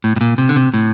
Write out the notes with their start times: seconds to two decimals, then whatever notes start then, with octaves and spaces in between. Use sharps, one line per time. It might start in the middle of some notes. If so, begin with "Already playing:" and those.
0.04 A2
0.16 A2
0.21 A#2
0.38 C3
0.49 D3
0.56 C3
0.74 A2